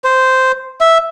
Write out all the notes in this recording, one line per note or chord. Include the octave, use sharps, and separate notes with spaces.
C5
E5